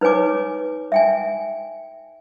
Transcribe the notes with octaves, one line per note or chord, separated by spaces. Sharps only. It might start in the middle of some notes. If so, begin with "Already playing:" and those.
D#4 B4 C#5 G#5 D6
E5 G5 G#5